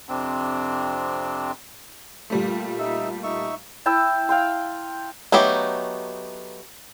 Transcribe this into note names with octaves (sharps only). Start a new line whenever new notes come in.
F2 C3 C4 D4
A#2 G3 A3
D#4 E5
D#4 E5 C#6
E4 G5 A5 E6
F5 G5 C6
F#3 A3 B3 D#4 G4